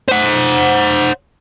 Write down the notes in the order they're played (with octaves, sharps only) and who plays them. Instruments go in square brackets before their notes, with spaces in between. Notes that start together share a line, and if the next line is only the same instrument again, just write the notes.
[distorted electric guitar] C5 F#5